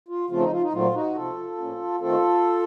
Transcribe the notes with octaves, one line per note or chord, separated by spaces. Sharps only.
F4
C#3 F3 A3 C4 F4
D#4
F4
D#4
A#2 F#3 A3 C4 F4
D#4 F#4
C3 F3 C4 F4 A4
A2 F3 A#3 C#4
D#3 A3 C4 F4 A4